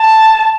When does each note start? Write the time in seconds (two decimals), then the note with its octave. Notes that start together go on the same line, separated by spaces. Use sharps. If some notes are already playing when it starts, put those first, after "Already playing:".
Already playing: A5